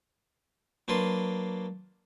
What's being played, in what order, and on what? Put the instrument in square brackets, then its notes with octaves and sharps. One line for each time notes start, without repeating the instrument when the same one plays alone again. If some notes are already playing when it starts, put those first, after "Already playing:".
[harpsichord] F#3 A#3 D4 B4 C6